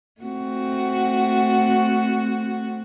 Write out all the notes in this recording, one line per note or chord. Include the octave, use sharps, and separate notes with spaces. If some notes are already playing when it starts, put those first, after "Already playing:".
A3 C4 F#4